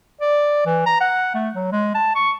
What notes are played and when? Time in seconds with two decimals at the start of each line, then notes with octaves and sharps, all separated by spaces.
0.21 D5
0.66 E3
0.86 A#5
1.00 F#5
1.34 A3
1.55 F#3
1.72 G#3
1.95 A5
2.15 C#6